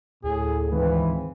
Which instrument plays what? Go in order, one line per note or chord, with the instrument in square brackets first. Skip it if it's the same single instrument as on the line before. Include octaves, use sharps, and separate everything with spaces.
[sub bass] D2 [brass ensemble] A2 [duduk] G#4
[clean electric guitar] G#2 D#3 [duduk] E3 [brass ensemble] C4 F4 B4